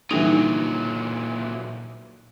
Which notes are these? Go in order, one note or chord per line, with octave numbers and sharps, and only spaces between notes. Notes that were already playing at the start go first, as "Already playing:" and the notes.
A#2 D3 E3 F#3 G3 D#4